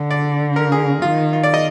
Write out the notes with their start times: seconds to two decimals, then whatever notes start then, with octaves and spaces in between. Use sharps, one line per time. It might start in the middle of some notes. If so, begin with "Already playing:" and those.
Already playing: D3
0.11 D5
0.56 A#4
0.72 G#4
1.02 D#3 F4
1.33 F4
1.44 D5
1.54 D#5